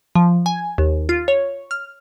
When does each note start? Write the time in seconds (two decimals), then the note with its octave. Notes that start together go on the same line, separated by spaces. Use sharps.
0.15 F3
0.46 G#5
0.78 D#2
1.09 F4
1.28 C#5
1.71 F6